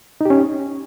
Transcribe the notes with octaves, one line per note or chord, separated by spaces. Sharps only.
C#4 D#4 G4